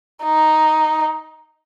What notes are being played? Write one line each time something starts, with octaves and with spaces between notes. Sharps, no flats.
D#4